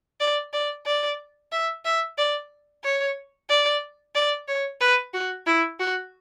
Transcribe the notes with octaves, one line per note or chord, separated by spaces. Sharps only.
D5
D5
D5
E5
E5
D5
C#5
D5
D5
C#5
B4
F#4
E4
F#4